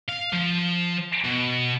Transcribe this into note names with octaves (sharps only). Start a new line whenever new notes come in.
F5
F3
B2